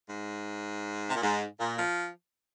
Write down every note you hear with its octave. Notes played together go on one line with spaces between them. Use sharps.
G#2
C3
A#2
G#2
A#2
F3